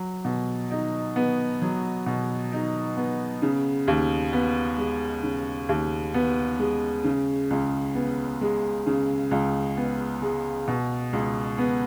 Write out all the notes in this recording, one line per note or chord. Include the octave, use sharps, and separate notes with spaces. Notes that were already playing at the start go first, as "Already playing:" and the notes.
Already playing: F#3
B2
D#4
B3
F#3
B2
D#4
B3
C#3
D#2
B3
G#3
C#3
D#2
B3
G#3
C#3
C#2
B3
G#3
C#3
C#2
B3
G#3
B2
C#2
B3